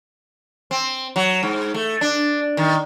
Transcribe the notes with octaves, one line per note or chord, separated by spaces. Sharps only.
C4
F#3
G#2
A3
D4
D#3